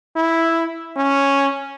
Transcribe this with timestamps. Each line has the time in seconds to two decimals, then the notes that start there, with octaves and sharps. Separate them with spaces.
0.16 E4
0.97 C#4